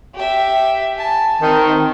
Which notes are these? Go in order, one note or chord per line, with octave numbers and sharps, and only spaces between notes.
G4 E5
G#5 A5
D#3 C4